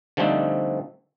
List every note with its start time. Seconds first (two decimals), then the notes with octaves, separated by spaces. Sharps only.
0.17 D3 F3 G3 A3 C4 D#4